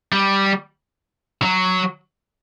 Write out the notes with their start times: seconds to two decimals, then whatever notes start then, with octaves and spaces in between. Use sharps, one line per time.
0.13 G3
1.42 F#3